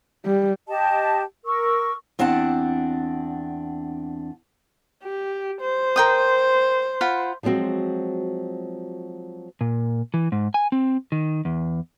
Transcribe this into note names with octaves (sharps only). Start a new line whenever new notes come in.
G3
G4 D#5 A5
A#4 C#6 E6
E2 C4 D4 F#5 A5
G4
C5
A#4 G5 D#6
F4 F#5 B5
F3 F#3 G#3 C4 F#4
A#2
E3
G#2
G#5
C4
D#3
E2